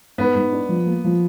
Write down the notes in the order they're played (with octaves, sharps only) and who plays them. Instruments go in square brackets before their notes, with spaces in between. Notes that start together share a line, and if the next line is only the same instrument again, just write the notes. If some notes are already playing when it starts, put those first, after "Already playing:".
[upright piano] G#2 [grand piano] B3
[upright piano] G#2
D4
F3
A#3
F3